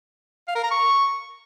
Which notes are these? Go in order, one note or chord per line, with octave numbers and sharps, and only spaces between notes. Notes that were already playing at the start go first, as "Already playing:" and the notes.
F5
A#4
A#5
C#6